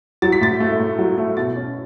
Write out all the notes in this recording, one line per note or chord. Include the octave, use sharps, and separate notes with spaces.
F#3 A6
B6
A2 A6
A3
A2
F#3
A3
B2 A6
C#4